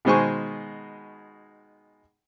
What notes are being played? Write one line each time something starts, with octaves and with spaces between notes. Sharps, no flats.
B2 D#3 G#3 C5 G#5 C#6